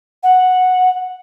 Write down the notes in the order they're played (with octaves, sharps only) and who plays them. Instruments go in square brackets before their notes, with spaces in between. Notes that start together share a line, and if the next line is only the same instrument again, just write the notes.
[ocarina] F#5